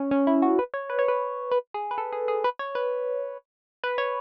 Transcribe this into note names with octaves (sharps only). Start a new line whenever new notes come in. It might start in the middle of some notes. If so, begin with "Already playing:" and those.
Already playing: C#4
C#4
E4
F#4
B4
C#5
B4
C#5
B4
B4
G#4
B4
A4
G#4
G#4
B4
C#5
B4
B4
C#5